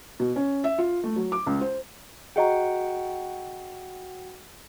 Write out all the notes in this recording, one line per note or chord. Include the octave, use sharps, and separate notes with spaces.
B2
C#4
E5
F4
A3
F#3
D6
C#2
C5
F#4 G#4 D#5 F#5 G5 A#5